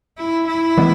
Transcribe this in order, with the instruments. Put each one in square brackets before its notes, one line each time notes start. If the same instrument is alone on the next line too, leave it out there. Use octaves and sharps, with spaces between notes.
[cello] E4
E4
[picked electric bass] E3 G#3 B3